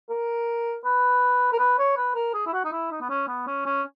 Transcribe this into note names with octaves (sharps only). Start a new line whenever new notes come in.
A#4
B4
A#4
B4
C#5
B4
A#4
G#4
E4
F#4
D#4
E4
D#4
B3
C#4
B3
C#4
C#4